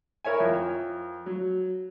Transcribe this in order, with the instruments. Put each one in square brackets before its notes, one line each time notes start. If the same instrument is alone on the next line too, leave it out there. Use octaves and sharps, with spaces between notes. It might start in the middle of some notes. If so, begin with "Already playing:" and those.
[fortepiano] E4 A#4 C#5 E5 G#5
F2
F#3